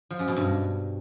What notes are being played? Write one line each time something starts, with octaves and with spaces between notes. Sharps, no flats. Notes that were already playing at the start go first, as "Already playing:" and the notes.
F3
F#2
B2
G2